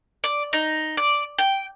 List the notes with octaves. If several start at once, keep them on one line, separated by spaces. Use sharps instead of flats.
D5
D#4
D5
G5